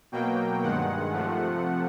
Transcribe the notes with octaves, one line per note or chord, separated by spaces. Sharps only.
B2 F#3 A#3 G5
G2 D#3 G#3 F#5
C3 F3 A3